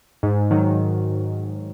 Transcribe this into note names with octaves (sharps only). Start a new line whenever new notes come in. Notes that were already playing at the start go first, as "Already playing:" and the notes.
G#2
D#3 F#3